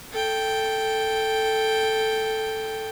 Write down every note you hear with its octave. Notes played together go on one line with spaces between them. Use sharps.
A4 G5